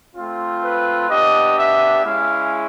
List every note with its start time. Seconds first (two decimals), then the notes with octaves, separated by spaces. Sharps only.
0.16 A3 C4 F4
0.62 B4
1.09 B3 D4 G4 D#5
1.56 E5
2.03 G#3 C#4 E4 F5